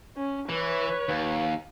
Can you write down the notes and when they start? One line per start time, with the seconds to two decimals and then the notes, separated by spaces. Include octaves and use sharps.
0.17 C#4
0.49 E3 B4 C#5
1.08 D#2